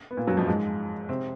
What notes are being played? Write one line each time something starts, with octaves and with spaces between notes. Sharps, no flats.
B3
A#2 A#3
F#2 F#3
F2 F3
G#2 G#3
C3 C4